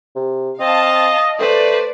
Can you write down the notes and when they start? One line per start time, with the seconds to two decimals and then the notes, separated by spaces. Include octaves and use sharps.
0.16 C3
0.60 C4 D#5 F5 A5
1.39 A3 B4 C5 D5